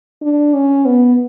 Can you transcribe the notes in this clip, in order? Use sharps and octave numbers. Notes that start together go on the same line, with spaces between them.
D4
C#4
B3